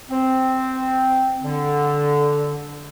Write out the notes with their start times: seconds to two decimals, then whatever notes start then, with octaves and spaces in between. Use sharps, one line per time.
0.10 C4
1.43 D3